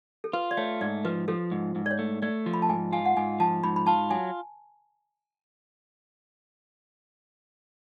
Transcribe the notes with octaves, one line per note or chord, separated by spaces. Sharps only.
A4
F4 B4
D5
A3 C#5
G#2 D5
F3 B4
F3 A4
G#2
G#2
D5
C#5
A3
A3 D5
F3
B5
A5
G#2 G#5
F4 G#5
F#5
G#2 G#5
F3 A5
G#2 B5
B5
F4 A5
F#3 G#5